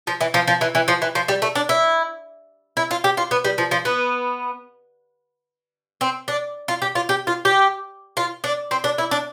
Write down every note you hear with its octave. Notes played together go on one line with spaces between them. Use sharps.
F3
E3
F3
F3
E3
E3
F3
E3
F3
G3
A3
D4
E4
E4
F4
G4
F4
B3
G3
F3
F3
B3
C4
D4
F4
G4
F4
G4
F4
G4
F4
D4
C4
D4
E4
D4